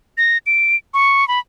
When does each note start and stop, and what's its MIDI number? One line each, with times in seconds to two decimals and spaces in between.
0.18 0.38 94
0.46 0.76 98
0.94 1.27 85
1.28 1.39 83